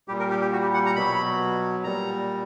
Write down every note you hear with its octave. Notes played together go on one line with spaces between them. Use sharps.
A#2 G3 G4
A#4
G4
G4
F#4
G4
F#5
A#5
B2 F#3 B5
A#2 G3 A#5